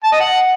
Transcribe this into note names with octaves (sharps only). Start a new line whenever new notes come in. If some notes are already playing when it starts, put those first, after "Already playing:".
A5
D#5
F#5